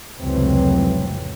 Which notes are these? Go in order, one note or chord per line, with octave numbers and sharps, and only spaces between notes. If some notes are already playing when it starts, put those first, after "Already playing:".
F1 C#2 A2 E3 F#3 C4